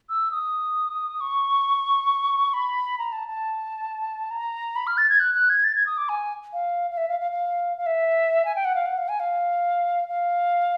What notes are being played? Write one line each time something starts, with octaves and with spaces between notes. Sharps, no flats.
E6
D#6
C#6
B5
A#5
A5
A5
A#5
B5
F6
A6
G#6
F#6
F#6
G#6
A6
G#6
D#6
D6
G#5
F5
F5
E5
F5
F5
F5
F5
E5
G#5
G5
F#5
F5
F#5
F5
G#5
F5
F5